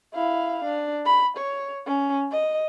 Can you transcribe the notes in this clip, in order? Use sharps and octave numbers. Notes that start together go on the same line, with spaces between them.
E4 F5
D4
B5
C#5
C#4
D#5